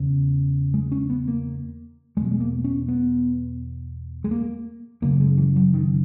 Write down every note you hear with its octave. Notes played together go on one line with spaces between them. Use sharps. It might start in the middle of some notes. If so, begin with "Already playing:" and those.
Already playing: E2 C#3
G#3
C#4
B3
A#3
E2 B2 F#3 G#3
G#3
A#3
C#4
B3
G#3
A#3
F#2 C#3 A#3
G#3
E3
F#3
D#3